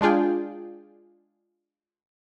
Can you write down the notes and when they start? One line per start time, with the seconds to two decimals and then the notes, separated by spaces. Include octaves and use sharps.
0.01 G#3 D4 F4 G#4 G5